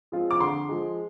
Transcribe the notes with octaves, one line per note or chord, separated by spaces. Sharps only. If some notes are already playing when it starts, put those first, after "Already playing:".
F3 G#3 C4 F4
D6
D3 C6
F3 G#3